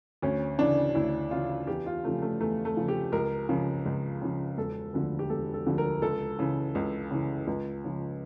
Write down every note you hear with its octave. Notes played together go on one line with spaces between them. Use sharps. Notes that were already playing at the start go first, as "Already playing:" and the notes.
D2 C#4
C#3 E3 D4
D2 E4
C#3 E3 F4
E2 G4
F4
C#3 F3 A3
A3
E2 A3
A3
C#3 F3
G4
C#2 A#4
C#3 F3
C#2
C#3 F3
E1 A4
D2 D3 F3
G4
E1 A4
A4
D2 D3 F3
A#4
C#2 A4
C#3 E3
C#2
C#3 E3
C#2
C#3 F3